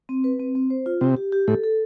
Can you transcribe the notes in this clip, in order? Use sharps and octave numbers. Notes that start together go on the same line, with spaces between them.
C4
B4
C4
C4
C5
F4
C3 G4
G4
G4
A2 A4
A4